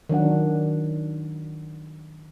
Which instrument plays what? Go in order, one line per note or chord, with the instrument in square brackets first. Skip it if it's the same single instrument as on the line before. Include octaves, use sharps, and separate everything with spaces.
[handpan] D#3 F#3 D4 F#5